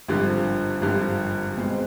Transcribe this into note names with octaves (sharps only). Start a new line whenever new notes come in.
G#1 G2 D3 F3
G#1 G2 D3 F3
B2 G#3 C4